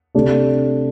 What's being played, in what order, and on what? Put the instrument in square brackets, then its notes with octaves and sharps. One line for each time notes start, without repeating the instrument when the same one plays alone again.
[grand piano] C3 A3 D4